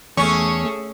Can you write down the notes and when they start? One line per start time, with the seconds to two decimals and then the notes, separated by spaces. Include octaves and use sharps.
0.17 E2 A3 C#4 G#4 A4 C#6